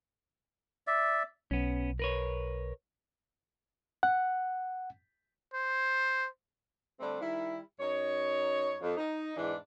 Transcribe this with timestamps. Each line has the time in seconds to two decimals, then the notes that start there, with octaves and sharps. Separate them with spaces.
0.87 D5 E5
1.51 B1 B3 C#4
1.99 A#4 B4 C#5
4.03 F#5
5.54 C5
7.00 D3 G3 A3 C4 D4
7.21 D#3 G3 E4
7.80 F#2 D#4 C#5
8.82 F2
8.97 D#4
9.37 E2 G#2 E3 D4